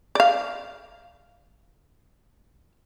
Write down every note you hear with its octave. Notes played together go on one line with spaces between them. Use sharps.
D5 F5